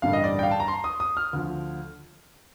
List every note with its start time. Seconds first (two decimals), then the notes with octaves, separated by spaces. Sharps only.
0.02 A1 G2 D3 G3 A#3 F5
0.13 D#5
0.24 D5
0.39 G5
0.43 F5
0.51 A5
0.60 A#5
0.68 C6
0.84 D#6
1.00 D#6
1.17 F6
1.33 D2 D3 F3